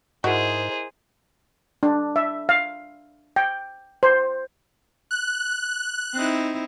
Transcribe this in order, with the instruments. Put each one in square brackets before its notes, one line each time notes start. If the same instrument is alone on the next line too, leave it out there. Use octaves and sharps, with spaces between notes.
[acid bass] G#2 [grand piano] E4 A#4 D#5 [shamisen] F#4 [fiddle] G#4 C5
[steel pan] D4
E5
F5
G5
C5
[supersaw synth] F#6
[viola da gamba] C4 D#4 E4